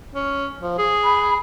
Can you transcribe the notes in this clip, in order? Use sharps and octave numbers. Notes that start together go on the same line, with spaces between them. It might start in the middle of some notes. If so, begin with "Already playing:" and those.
C#4
F3
G#4
B5